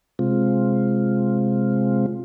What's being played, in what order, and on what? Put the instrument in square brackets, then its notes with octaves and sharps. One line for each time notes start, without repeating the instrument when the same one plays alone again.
[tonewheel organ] C3 G#3 C4 F4